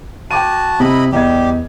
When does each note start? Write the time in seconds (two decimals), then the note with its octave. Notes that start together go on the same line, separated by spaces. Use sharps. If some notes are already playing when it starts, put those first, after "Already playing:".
0.31 F#4 G5 A5 D6 D#7
0.80 C3 E4 D#5 B5
1.12 E2 G3 G4 D#5 G#6